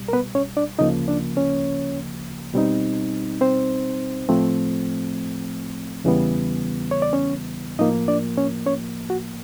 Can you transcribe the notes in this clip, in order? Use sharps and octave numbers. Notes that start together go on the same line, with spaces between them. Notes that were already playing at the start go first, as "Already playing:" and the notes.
Already playing: C2 B2 G3
A#4
B3 B4
C#4 C#5
D4 D5
D2 C#3 F3 A#3 D#4 D#5
D4 D5
C#4 C#5
B2 G3 C4 D#4
C4 C5
A2 F3 A3 C4
E2 C#3 E3 G3 B3
C#5
D5
C#4 C#5
A2 F3 A#3 D#4 D#5
D4 D5
C#4 C#5
C#4 C#5
F#4